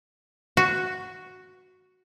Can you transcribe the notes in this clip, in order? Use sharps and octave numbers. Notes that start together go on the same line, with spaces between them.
F#4